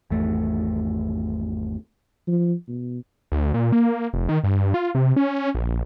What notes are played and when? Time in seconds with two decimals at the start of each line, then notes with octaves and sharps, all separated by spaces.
0.10 G#1 E2 A3
2.28 F3
2.68 B2
3.32 D2
3.54 A#2
3.72 A#3
4.13 F1
4.29 D#3
4.44 G2
4.74 F4
4.95 C3
5.16 C#4
5.55 A#1